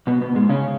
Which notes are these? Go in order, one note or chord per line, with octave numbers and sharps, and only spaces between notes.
B2 B3
B2 B3
G#2 G#3
C#3 C#4